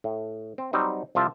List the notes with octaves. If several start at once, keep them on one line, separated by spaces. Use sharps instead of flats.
A2
C4
F#3 G3 C4 D#4
C2 F3 F4 E5 A5